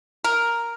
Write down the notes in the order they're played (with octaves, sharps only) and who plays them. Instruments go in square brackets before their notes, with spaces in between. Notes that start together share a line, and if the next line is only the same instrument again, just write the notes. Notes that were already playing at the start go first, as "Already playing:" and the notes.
[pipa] A#4